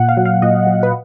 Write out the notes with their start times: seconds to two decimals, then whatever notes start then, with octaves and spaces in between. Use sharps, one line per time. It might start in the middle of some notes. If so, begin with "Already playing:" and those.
Already playing: A#2 F#5
0.09 F5
0.17 F#3
0.25 F5
0.42 A#2 D#5
0.67 F#3
0.83 B4